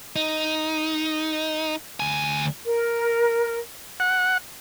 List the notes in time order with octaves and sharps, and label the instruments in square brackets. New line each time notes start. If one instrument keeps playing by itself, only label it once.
[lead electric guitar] D#4
D2 G#5
[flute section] A#4
[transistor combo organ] F#5